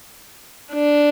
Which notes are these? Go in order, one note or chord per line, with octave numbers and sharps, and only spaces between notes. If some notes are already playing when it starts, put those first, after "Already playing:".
D4